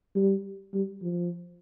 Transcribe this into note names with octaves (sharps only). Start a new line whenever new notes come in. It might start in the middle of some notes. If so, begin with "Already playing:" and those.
G3
G3
F3